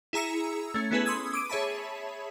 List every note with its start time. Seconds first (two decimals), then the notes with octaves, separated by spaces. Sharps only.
0.13 E4 G#4 A#5 E6 C#7
0.74 A3 C#4
0.91 B3 C#4 E4 G#4 A4 B4
1.06 C6 D#6 E6 G#6
1.33 D6 D7 D#7
1.49 G#4 C#5 E5 A5 B5